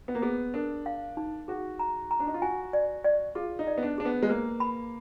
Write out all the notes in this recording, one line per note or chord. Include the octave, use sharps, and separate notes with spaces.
B3
A#3
B3 G#4
D4 A#4
F5
D#4
F#4 G#4
A#5
A#5
D4
D#4
F4
F#4 G#5
D5
D5
F4 G#4
D#4
D5
B3
D4
D4 G#4
B3
G#3
A#3 B4
B5